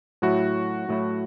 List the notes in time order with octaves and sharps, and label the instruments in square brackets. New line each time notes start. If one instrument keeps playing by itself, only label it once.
[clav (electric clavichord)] A2 F#3 A3 E4 [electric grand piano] F#4
[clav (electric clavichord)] A2 F#3 A3 E4